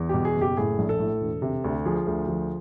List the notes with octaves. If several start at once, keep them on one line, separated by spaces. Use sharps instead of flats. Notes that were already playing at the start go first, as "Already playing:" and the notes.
Already playing: E2
B2 G4
G#4
F#1
G4
A2 G#4
A#1
A4
A2
E1
C3
D2
F3 G#4
D2
F3